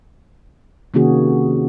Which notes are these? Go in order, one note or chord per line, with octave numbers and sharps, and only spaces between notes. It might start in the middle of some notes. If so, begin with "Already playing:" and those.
C3 D#3 A#3 C#4 F#4 G#4